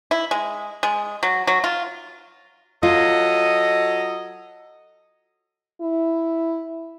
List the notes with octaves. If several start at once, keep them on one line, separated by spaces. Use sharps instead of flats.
E4
G#3
G#3
F#3
F#3
F4
F#3 F4 A4 D#5
E4